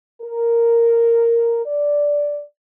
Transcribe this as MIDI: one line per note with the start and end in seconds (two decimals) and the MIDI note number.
0.21 1.61 70
1.66 2.40 74